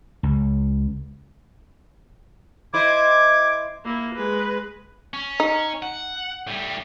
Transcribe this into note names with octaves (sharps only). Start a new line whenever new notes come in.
C#2
E4 C5 D#5 D6 G#6
A#3 E4
G#3 B4
C#4
D#4
F#5
A2 G3